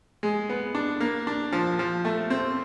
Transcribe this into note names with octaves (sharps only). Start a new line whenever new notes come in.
G#3
B3
D4
A#3
D4
F3
F3
A3
C4